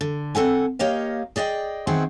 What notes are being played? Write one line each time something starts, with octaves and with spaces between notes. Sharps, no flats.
D3
C4 A4 F#5 G#5
A#3 G4 C#5 D#5 F5
G#4 D5 D#5 F5 G5
D#3 B3 C4 G#4 E5 F#5